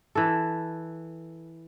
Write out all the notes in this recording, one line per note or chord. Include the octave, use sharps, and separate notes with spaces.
E3 A4